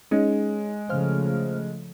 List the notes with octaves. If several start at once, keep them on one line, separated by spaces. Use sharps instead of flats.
G#3 C#4 D#4
C#3 F3 A3 C5 F5 F6